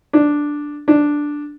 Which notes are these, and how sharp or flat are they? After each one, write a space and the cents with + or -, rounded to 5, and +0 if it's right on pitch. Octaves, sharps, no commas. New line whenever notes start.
D4 +0
D4 +0